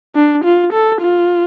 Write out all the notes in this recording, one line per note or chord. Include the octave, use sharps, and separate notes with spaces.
D4
F4
A4
F4